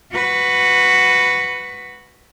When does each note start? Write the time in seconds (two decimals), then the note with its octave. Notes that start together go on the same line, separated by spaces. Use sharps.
0.11 F#4 B4